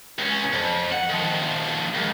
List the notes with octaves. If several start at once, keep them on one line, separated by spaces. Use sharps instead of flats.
C#2 C#4
F2
F#5
D#3 F3
C#2